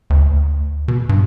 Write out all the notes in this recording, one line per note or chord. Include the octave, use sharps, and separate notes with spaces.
D2
B2
G2